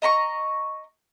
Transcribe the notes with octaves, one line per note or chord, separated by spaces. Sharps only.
D#5 A#5 B5 C#6